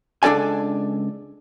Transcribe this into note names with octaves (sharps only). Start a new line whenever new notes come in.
C#2 D4 A4 D5 G#5